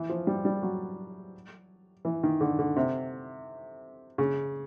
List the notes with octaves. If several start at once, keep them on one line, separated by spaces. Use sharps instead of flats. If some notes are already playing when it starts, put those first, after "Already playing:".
Already playing: E3
F3
G3
G3
F#3
E3
D#3
D3
D3
C3
C#3